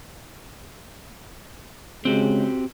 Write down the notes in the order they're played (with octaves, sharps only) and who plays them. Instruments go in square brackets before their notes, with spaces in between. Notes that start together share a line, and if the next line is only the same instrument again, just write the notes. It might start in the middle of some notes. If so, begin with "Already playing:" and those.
[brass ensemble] C#3 G#3 [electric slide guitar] C4 F#4 G4